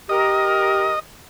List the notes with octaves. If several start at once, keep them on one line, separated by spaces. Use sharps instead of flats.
G4 A#4 D#5